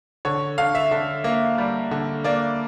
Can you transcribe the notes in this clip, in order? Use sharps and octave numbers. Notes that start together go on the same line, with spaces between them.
D3 C#5
D3 F5
E5
D3
A#3
G3
D3
A#3 D5